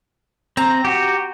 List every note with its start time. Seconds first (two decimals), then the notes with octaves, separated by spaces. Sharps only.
0.57 C4 A#5
0.85 F#4 G4